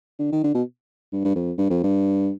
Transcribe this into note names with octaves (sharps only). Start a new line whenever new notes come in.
D3
D#3
D3
B2
G2
G2
F2
G2
F2
G2